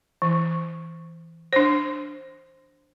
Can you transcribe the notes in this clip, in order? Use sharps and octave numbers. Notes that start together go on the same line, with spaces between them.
E3
D4 C5